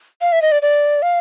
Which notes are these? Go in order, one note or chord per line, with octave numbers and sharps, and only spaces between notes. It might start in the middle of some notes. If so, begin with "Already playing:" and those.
F5
E5
D#5
D5
D5
F5